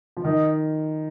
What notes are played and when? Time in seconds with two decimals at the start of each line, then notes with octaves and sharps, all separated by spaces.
0.17 F3
0.24 D#3 D#5